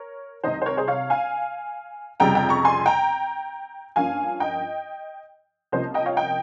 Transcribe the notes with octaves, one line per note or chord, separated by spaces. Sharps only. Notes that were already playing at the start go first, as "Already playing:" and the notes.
Already playing: A#4 C#5
C2 C3 D#3 C5 D#5
C5
A#4 C#5
G#4 C5
C#5 F5
F5 G#5
F1 F2 C#3 G3 G5 A#5
G5 A#5
A#5 C#6
G#5 C6
G5 A#5
G2 F3 A#3 C#4 F5 G#5
D#5 G5
C2 C3 F3 A#3 C#4 C5 D#5
D#5 G5
C#5 F5
D#5 G5